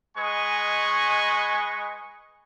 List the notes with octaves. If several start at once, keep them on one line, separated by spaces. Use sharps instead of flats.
G#3 B4 D#5 G#5 C#6